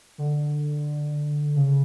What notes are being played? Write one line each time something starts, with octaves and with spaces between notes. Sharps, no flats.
D3
C#3